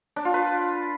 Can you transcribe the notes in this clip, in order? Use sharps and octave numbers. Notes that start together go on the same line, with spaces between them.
D4
F4
B4